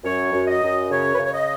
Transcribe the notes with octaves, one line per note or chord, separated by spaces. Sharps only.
F#2 C#5
F#2
D#5
F#2
C#3 C#5
C#3 B4
C#5
D#5